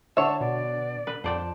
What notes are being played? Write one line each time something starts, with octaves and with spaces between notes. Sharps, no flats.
D3 C#5 E5 A5
B2 D5
B4
F2 C5 D5 G5 A5